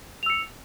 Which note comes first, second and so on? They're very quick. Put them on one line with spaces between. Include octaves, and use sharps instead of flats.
F7 E6 C#7